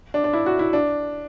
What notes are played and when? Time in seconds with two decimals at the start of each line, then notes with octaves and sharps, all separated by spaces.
0.14 D4
0.24 D4
0.33 E4
0.46 F#4
0.59 E4
0.73 D4